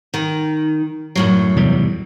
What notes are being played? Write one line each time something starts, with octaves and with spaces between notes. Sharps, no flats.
D#3
F#2 A2 F#3
E2 C3 G3